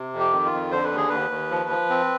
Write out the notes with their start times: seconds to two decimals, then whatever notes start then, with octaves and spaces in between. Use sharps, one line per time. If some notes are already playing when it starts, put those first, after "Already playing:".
Already playing: C3
0.13 F2
0.20 G4
0.32 D#3
0.46 F4
0.52 F2
0.71 D3 C5
0.84 B4
0.91 D#2
0.97 G#4
1.09 D#2 B4
1.30 D#2
1.51 F3
1.70 F3
1.90 C4